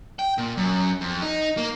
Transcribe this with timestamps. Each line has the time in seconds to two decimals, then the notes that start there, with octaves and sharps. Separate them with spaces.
0.19 G5
0.38 A#2
0.57 F#2
1.01 F2
1.22 D#4
1.57 A#3